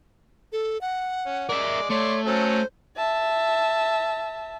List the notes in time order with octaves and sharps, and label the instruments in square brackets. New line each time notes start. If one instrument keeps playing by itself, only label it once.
[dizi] A4
F#5
[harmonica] C#4
[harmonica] G#3 D5 [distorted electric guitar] A#4 E5
[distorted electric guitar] A3 [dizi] C#5 [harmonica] D5 C6
[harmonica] F#3 C#4 A4 [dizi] C5
[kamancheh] E5 A5